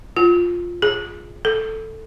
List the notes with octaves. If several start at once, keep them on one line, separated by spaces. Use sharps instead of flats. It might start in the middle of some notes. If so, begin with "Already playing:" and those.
F4
G#4
A4